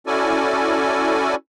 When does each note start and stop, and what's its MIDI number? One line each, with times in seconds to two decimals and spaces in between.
0.07 1.35 61
0.07 1.35 64
0.07 1.35 66
0.07 1.35 69
0.07 1.35 74
0.07 1.35 80